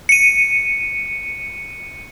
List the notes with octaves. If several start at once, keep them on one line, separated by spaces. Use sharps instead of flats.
C#7 D#7